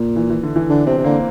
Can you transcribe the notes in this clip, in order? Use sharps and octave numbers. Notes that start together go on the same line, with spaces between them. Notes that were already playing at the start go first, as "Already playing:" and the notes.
Already playing: A#2
E3
E3
D3
E3
D3 D4
C3 C4
C3
D3 A#3